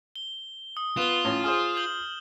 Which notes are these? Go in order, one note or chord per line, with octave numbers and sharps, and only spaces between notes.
G7
D#6
B3 F4 E7 G7
A2 C#4
G#4 C5 D#6 F6 G7
G6 F#7